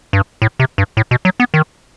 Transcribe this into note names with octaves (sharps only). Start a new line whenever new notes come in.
G2
A2
C3
G2
A2
B2
F#3
B3
D#3